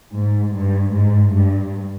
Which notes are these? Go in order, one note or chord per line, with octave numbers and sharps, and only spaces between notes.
G#2
G2
G#2
G2